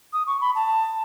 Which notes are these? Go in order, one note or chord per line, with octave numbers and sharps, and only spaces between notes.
D#6
C#6
B5
A5